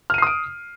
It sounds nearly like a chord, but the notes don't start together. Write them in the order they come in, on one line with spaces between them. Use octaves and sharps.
F6 D#7 C7 D#6 D7